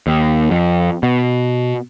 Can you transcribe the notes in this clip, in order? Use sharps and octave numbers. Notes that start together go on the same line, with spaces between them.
D#2
F2
B2